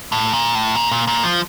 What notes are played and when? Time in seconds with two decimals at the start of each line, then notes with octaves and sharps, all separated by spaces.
0.12 A2
0.32 A#2
0.55 A2
0.75 A#2
0.91 A#2
1.07 A#2
1.24 F3